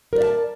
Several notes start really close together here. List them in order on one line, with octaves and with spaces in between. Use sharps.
A#4 B4 D5 E5 A5